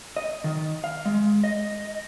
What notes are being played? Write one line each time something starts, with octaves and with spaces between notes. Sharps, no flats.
D#5
D#3
F5
G#3
D#5